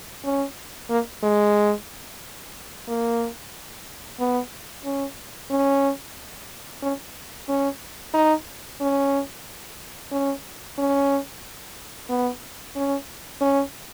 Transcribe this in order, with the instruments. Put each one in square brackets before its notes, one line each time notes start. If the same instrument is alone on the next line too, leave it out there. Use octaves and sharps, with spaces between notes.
[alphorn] C#4
A#3
G#3
A#3
B3
C#4
C#4
C#4
C#4
D#4
C#4
C#4
C#4
B3
C#4
C#4